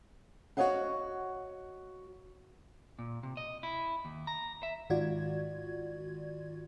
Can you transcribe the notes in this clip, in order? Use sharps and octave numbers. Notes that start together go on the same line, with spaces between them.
F#4 G4 C#5 D#5 F5 F#5
A#2
C3
D#5
E4
D#2
A#5
E5
G#2 D#3 F4 F#4 D5 G#6